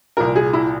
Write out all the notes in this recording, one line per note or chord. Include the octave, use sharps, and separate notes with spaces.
C2 A#2 A#4
G#4
E4